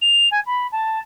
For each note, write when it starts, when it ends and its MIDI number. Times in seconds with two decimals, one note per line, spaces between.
0.01 0.28 101
0.31 0.40 80
0.46 0.67 83
0.72 0.99 81